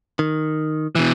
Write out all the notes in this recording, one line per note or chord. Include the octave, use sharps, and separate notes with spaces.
D#3
B2 E3